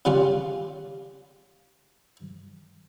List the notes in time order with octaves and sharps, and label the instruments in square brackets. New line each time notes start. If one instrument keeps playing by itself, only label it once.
[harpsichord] C#3 G3 C#4 F4 D5